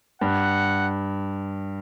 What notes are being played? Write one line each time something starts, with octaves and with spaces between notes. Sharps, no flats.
G2 F#5